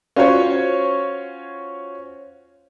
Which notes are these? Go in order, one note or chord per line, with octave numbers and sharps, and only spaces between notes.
C#4 F4 F#4 C5 C#5